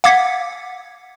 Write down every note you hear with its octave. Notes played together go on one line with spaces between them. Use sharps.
F5 F#5 D6 G#6 B6